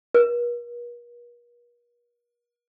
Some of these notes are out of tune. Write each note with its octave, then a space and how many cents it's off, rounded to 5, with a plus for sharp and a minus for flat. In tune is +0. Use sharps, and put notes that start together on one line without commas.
A#4 +45